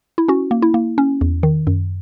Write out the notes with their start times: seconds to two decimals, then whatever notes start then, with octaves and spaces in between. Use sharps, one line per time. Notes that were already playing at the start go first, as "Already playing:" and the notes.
0.18 E4
0.28 C#4 F#4
0.51 A#3
0.62 E4
0.74 A#3
0.98 C#4
1.21 E2
1.43 D#3
1.67 F#2